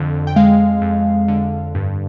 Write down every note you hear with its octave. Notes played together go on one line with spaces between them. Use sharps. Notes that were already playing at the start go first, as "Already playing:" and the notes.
Already playing: F2 D3
G5
G#3 F5
F2
D3
G2